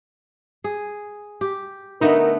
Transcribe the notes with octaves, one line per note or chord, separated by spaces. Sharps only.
G#4
G4
D3 A3 B3 D#4 A#4